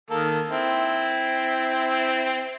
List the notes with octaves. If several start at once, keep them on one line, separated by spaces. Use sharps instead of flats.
D#3 A#3 A4
C4 E4